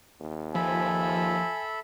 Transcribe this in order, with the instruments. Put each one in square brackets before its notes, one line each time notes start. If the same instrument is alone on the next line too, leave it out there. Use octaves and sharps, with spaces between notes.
[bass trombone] D#2
[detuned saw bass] F3 [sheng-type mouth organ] A4 E5 B5 [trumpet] G#5